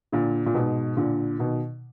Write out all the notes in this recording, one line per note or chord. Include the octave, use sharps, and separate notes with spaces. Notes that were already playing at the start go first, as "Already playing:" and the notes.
A#2 D3
A#2
G#2 B2
A#2 D3
B2 D#3